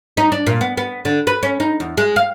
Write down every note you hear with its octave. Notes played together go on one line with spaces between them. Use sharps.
D#4
D4
A#2
B3
B3
D3
B4
C#4
D#4
E2
G#3
F5